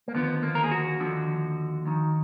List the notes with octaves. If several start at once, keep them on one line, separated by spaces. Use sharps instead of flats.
A#3
D#2 D3 F3 B3
A#3
A#4
G#4
F#4
D#2 D3 F3
D#2 D#3